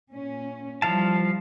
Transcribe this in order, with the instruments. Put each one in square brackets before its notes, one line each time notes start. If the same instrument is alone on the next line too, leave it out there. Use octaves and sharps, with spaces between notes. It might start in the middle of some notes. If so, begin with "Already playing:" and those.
[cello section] A#2 C#4
[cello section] E3 G3 [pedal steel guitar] F3 F5 A5